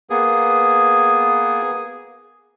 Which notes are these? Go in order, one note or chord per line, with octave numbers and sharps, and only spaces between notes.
A#3 B3 G#4